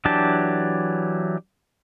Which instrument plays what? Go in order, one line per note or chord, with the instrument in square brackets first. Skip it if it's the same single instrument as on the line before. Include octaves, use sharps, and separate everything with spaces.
[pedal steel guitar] E3 F#3 D4 G4 A5